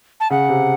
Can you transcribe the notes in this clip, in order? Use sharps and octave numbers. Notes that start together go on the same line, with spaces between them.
A5
C#3 F#5
C3